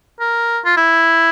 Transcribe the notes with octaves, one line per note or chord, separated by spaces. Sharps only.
A#4
F4
E4